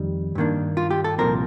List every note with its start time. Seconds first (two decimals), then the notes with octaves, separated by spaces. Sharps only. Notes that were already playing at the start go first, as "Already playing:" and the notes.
Already playing: F2 D#3 G3
0.35 G2 D#3 A#3 D4
0.77 F4
0.91 G4
1.04 A4
1.18 C2 A#2 F3 C4 A#4